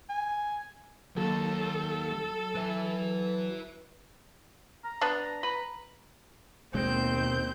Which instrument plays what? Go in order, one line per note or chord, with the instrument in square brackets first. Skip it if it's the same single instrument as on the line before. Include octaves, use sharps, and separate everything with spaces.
[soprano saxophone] G#5
[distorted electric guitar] D#2 [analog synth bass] F#3 [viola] A4
[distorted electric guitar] B4 E5
[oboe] A#5
[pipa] B3 D4
B4
[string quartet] D#2 G6 [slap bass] B2 G#3 [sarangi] C4